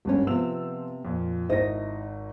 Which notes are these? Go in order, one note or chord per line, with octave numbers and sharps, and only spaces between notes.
G#1 G2 G3 C#4
C3 F3 B3 E6 F7
F2 A#2
G#1 D#4 E4 C5 D#5 A#6